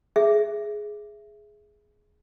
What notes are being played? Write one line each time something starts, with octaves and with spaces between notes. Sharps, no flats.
G#4 E5